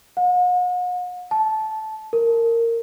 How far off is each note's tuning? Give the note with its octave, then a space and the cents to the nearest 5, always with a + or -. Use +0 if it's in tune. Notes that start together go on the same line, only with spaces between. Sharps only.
F#5 -45
A5 -15
A#4 -20